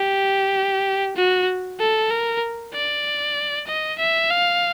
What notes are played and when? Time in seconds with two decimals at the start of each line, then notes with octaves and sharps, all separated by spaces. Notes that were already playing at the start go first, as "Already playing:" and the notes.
Already playing: G4
1.16 F#4
1.79 A4
2.11 A#4
2.74 D5
3.67 D#5
3.98 E5
4.30 F5